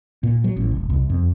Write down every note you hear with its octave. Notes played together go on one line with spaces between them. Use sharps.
A#2
F#3
A1
E1
C2
F2